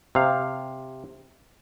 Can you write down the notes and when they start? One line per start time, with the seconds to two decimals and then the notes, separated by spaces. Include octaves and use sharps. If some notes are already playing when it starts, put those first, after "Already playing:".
0.15 C3 F5